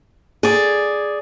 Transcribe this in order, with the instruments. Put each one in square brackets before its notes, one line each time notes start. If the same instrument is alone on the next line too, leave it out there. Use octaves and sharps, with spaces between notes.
[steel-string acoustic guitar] G#4 D5